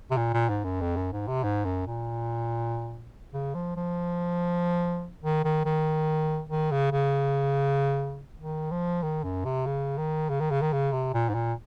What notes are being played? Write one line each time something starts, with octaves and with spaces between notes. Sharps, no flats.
C3
A#2
A#2
G#2
F#2
F2
F#2
G#2
C3
G#2
F#2
A#2
C#3
F3
F3
D#3
D#3
D#3
D#3
C#3
C#3
D#3
F3
D#3
F#2
C3
C#3
D#3
C#3
D#3
C#3
D#3
C#3
C3
A#2
G#2
A#2